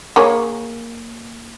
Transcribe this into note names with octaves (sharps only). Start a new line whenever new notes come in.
A#3 G#4 C#5